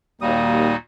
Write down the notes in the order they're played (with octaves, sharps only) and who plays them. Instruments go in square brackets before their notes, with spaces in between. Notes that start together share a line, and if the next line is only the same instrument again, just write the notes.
[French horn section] D#2 [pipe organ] A#2 D#4 F#4 [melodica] G3 D#6 [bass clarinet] A#3